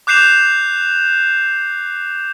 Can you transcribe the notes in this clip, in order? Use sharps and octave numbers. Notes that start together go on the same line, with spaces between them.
D6 F#6 G6 C7 E7 F7